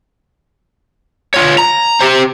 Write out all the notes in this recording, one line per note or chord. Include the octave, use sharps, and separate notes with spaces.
F4 C#5
A#5
G4 C5